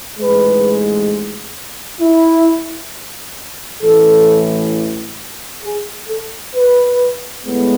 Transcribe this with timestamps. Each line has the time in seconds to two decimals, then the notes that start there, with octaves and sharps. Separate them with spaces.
0.19 A1 G#2 G#3 B4
2.00 E4
3.82 A1 A2 E3 A4
5.63 G#4
6.08 A4
6.55 B4
7.45 A2 G#3 B3